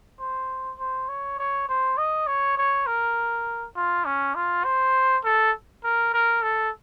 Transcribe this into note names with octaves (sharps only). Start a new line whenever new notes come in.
C5
C5
C#5
C#5
C5
D#5
C#5
C#5
A#4
F4
C#4
F4
C5
A4
A#4
A#4
A4